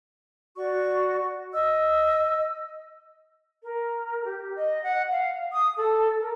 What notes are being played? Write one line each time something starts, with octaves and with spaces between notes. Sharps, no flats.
F#4 D5 C#6
D#5 E6
A#4
G4
D#5
F#5
F5
D#6
A4
A#4